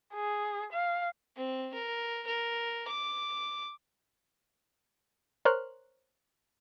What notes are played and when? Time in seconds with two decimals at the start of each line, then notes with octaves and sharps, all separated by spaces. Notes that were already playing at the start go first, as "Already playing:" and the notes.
0.14 G#4
0.72 F5
1.36 C4
1.74 A#4
2.27 A#4
2.88 D6
5.45 A#4 C5 C#5 F6 F#6